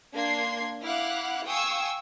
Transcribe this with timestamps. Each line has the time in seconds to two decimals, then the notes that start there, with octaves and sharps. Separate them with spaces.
0.14 A#3 D4 C6 G#6 C7
0.84 E4 F5 F#5 D6 F6 F#6
1.46 F5 G5 G#5 C#6 D#6 E6